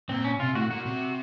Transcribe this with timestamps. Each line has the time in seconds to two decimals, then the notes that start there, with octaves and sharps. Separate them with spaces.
0.09 A#2 C4
0.24 C#4
0.39 C3 F4
0.55 A2 F#4
0.70 A#2 F#4
0.85 C3